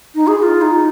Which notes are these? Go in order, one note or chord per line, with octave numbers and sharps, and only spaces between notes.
D#4
G#4
G#4
F4
D#4